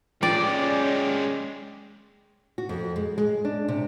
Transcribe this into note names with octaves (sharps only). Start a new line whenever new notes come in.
G#3 C#4 F4 G4 D5 G5
F#4
F2
G#3
G#3
D4
C3